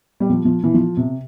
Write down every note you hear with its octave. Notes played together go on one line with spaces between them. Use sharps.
G3
F3
F3
E3
F3
C3